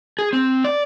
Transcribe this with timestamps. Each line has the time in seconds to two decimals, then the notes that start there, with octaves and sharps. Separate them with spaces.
0.19 G#4
0.33 C4
0.64 D5